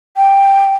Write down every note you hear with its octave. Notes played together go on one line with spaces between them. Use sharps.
G5